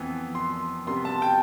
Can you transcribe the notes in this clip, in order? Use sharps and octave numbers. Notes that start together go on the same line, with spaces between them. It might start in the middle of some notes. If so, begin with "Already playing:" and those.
Already playing: F2 E3 B3
C6
C3 G3 B3 C6
A5
G5